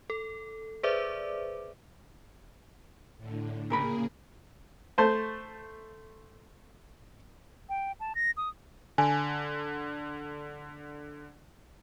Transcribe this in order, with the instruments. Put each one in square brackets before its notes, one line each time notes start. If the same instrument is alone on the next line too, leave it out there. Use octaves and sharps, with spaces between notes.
[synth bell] A4
G#4 B4 C5 D5 E5 D6
[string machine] A2 D3
[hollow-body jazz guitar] A#2 A#4 B5 [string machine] C#3 A#3 G#4
[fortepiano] A3 C5 A5
[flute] G5
A5
A#6
D#6
[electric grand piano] D3 [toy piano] G#5